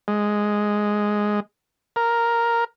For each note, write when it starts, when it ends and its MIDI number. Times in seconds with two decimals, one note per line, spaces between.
0.08 1.40 56
1.96 2.64 70